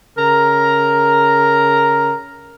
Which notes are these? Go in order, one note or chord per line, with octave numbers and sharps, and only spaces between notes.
C#3 A#4 A#5